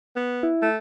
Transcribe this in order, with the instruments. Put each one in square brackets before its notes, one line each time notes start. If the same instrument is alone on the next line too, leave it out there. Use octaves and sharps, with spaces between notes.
[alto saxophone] B3
[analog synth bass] E4
[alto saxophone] A3